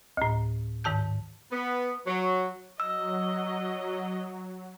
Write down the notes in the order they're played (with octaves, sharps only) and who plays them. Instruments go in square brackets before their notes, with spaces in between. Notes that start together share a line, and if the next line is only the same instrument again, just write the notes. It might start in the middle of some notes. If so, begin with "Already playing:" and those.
[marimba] D2 A2
G#2 D#3 A5 G6
[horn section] B3
F#3
[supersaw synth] F#3 [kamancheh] D#5 [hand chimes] E6